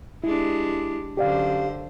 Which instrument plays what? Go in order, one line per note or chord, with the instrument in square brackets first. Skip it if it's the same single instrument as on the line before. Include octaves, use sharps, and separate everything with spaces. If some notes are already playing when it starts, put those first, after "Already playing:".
[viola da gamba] G#3 D4 G4 [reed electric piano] E4
[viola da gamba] F#2 D3 C5 [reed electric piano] G4 D5 F5